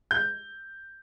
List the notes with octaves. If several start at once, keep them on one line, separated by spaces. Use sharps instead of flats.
G6